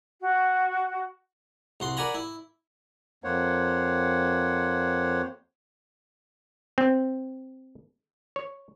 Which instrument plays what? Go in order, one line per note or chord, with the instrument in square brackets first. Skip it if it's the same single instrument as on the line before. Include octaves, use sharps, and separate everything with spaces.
[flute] F#4
[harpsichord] C2 F#4 C6
A#4 D5 F#5 G#5 A#5 B5
E4
[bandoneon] F2 A#3 C5 C#5 F#5
[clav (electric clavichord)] C4
C#5